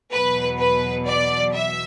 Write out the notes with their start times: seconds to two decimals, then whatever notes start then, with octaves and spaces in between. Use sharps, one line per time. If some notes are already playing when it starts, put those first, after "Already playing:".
0.12 E2 B2 F#3 B4
0.59 B4
1.07 D5
1.53 E5